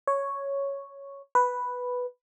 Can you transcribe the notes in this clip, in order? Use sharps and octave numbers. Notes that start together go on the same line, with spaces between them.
C#5
B4